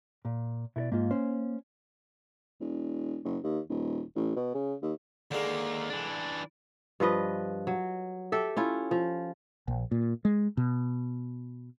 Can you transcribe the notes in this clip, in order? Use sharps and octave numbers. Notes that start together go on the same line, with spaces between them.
A#2
B2 E4 A4 D5
G#2 A#3 F4
C#4 C5
E1
F#1
D#2
D#1
A1
B2
C#3
D#2
D#2 D3 G#3 A#3
E3 D4
G2 F3 B4 D#5
F#3
G4 A4 E5
C#4 E4 F4
F3
A#1
A#2
G#3
B2